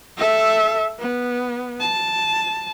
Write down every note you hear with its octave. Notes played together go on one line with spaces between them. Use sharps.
A4 E5
B3
A5